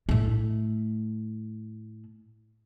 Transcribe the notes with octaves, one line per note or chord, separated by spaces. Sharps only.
A2 A3